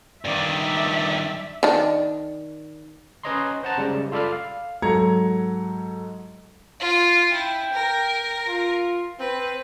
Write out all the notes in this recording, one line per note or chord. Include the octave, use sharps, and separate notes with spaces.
G2 D#3 D5 E5
D#3 D4
C#4 B4 C#5 D#5 A#5 C6
C5 F#5 A5 A#5
C#3 G3 G#3
F4 A4 D5 B5 F6
F5
G#2 F#3 A4 A#5 G#6 C#7
F4
E4 G5
A#4
F4
C4 B4